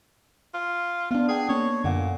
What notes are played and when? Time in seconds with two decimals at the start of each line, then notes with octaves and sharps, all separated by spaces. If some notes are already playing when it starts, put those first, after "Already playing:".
0.54 F4
1.11 B3 D4 F4
1.28 G#4 F#5 G5
1.49 A#3 C#4 C#5
1.84 F#2 A#2 D3 F#5